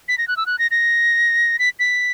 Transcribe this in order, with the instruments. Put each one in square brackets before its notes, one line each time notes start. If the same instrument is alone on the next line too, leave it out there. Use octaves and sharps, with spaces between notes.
[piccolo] B6
A#6
F#6
E6
F#6
A#6
A#6
B6
B6